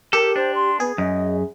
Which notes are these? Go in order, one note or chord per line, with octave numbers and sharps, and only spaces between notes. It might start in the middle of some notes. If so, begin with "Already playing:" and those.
G4 A4 A#4
D4 C5
C6
B3 G#4
F#2 D#5